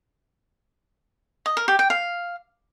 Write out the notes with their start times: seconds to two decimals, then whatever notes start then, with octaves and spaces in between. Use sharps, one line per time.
1.46 D#5
1.57 A#4
1.68 G4
1.79 G5
1.90 F5